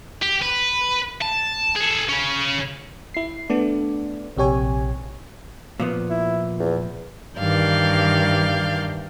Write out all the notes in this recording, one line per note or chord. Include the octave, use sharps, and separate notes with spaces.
G4
B4
A5
G#4 A4
C#3 C#4
E4 C7
A3 B3 D4 D5
A#1 C3 G4 C#5 G#5
A#2 F3 B3
E4
E2
G2 D#3 E3 D5 F5 G6